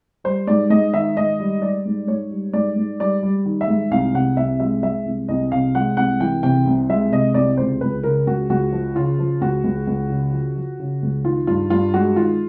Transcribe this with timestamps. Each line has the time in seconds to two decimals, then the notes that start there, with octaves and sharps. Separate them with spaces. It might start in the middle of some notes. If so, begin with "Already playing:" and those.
0.24 G3 C5
0.47 G#2 D5
0.70 G#2 D#5
0.94 D#3 E5
1.16 G#2 D#5
1.40 G3
1.62 G3 D5
1.85 G#2
2.07 G#2 C#5
2.31 G3
2.53 G#2 D5
2.76 G#2
3.00 G3 D5
3.23 G3
3.46 D#3
3.61 E5
3.68 G#2
3.91 C2 F5
4.14 C3 F#5
4.37 C2 E5
4.60 G#3 E5
4.83 G#3 E5
5.06 C2
5.28 C2 D#5
5.52 C3 F5
5.75 G#3 F#5
5.97 C2 F#5
6.20 E3 G5
6.43 C3 G5
6.66 C2
6.89 G#3 E5
7.12 C3 D#5
7.34 C2 D5
7.57 C#2 C5
7.81 C#2 B4
8.03 C#3 A#4
8.27 C#2 F#4
8.50 C#2 F#4
8.73 F3
8.95 C#3 F4
9.19 F3
9.41 C#2 F#4
9.64 C#2
9.87 C#2
10.10 C#3
10.33 F3
10.56 F3
10.79 C#3
11.02 C#2
11.24 D#3 F4
11.47 G2 F4
11.70 G2 F4
11.94 G#3 F#4
12.16 D#3 F4